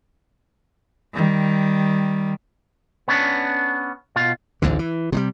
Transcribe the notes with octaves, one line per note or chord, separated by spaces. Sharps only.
D#3 G3
B3 C#4 D4
B2 F4
A1 D2 G#2 D3
E3
C3 F#3 G3